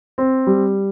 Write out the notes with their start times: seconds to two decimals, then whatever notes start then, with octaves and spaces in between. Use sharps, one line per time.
0.18 C4
0.47 G3